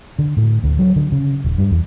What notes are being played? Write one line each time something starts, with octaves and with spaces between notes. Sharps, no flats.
D3
A2
D2
F#3
D3
C#3
D#1
G2
E2